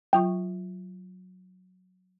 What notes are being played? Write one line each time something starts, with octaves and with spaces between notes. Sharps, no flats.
F#3 F4 G5 C#6